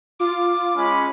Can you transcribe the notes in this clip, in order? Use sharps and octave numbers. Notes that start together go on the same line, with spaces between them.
F4 D6
G#3 C#4 B5